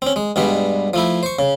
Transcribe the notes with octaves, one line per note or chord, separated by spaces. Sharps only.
C4 C#4
G#3
G2 B2 G3 G#3
F3 A3 E4
C5 C#6
C#3